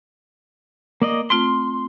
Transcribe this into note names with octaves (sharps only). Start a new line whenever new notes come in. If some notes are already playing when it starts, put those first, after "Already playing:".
A#3 D5 D#5
A3 C4 F4 C6